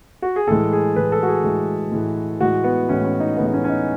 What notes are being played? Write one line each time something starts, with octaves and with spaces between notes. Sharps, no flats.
F#4
G#4
A2 E3 G#3 A4
G#4
A2 E3 G#3 B4
A4
F#4
G#4
A2 E3 G#3
A2 E3 G#3
A2 E3 G#3 F#4
B3
A2 E3 G#3 C#4
C#4
D#4
A2 E3 G#3 B3
D#4
C#4
C#4
D#4